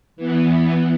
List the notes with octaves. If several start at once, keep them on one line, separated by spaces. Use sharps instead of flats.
E3 B3